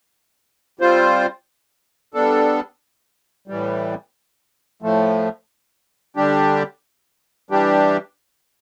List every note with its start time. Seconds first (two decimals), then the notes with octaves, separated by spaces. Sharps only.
0.80 G3 C4 F4 C5
2.14 G3 B3 D4 A4
3.48 A2 E3 G3
4.82 A2 F3 A3
6.16 D3 G3 D4 G4
7.50 E3 G3 D4 G4